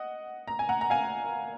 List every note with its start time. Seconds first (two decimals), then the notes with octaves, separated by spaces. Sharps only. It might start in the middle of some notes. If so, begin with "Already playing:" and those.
Already playing: D#5 F#5
0.48 A#5
0.59 G#5
0.69 F#5 A#5
0.81 A#5
0.90 F5 G#5